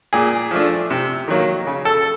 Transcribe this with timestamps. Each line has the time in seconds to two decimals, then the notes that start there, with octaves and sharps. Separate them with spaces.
0.13 A#2 G#4
0.51 F3 A3 D4
0.91 C3
1.28 D#3 F#3 A#3
1.67 C#3
1.85 A4